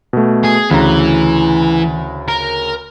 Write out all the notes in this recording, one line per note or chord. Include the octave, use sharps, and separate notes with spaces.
B2 A3
G#4
D2 C#3 E3 A#5
A#4